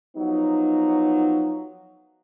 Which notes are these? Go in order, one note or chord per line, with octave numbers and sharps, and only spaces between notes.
F3 F#3 B3 D#4